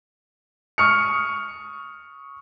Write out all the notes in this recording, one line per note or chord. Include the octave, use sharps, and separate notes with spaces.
C#6 D#6 F6 C#7